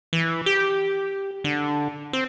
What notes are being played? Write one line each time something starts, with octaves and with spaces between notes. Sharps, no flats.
E3
G4
D3
C4